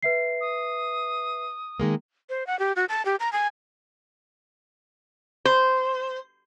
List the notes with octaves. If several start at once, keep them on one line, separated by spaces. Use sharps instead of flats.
B4 E5 C7
D#6
D#3 G#3 A#3
C5
F#5
G4
F#4
A5
G4
A#5
G#5
C5